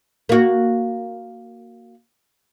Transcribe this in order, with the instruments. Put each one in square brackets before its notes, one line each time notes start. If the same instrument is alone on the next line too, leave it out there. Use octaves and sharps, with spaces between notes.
[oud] A#3 F#4